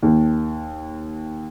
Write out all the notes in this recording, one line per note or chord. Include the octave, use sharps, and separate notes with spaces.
D#2